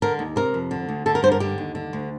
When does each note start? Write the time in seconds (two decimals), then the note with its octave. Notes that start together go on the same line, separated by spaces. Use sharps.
0.02 D3 A#4
0.19 D#2
0.36 C3 A#4
0.54 F2
0.71 D3
0.88 D2
1.06 D3 A4
1.15 A#4
1.23 G2 C5
1.32 A#4
1.40 D3 G4
1.58 D#2
1.75 D3
1.93 D2